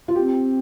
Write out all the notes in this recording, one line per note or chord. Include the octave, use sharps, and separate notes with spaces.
F4
C4 G4